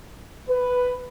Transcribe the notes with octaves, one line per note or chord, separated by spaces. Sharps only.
B4